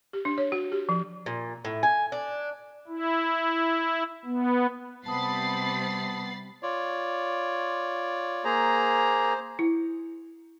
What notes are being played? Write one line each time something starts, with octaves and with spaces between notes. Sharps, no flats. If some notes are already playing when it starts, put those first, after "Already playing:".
G4
D4
C#5
F#4
G4
F3
A#2
A2
G#5
D4
E4
B3
C3 G3 B3 A5 B5 D#6 A6 C7
F4 C#5 D5
A#3 G#4 C5 A#5
E4